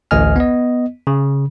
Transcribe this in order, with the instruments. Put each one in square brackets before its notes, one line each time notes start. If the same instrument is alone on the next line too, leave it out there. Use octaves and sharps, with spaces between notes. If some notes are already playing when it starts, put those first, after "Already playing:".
[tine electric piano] A1 D2 D#5 G#5 F6
B3 D#5
C#3